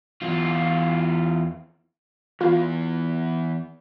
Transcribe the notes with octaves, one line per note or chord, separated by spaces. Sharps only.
E2 F4
E3 B3 F4 B4